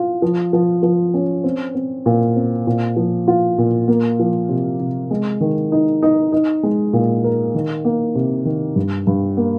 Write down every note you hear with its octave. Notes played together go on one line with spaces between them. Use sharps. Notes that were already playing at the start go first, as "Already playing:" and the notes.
Already playing: F4
F3
F3
F3
C#4
C4
C4
A#2
C4
A#2
F3
F4
A#2
A#3
F3
C3
C3
G#3
D#3
D#4
D#4
D#4
G#3
A#2
A#4
D#3
A#3
C3
D#3
G2
G2
A#3